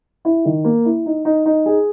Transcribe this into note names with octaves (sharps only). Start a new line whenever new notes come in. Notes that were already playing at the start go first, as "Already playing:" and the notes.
E4
D#3
A#3
E4
D#4
D#4
D#4
G#4